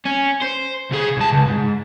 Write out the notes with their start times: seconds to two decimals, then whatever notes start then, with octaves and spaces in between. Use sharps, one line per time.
0.05 C#4
0.42 C5
0.91 C3 G#4
1.17 C2 A5
1.32 C#2
1.48 G#2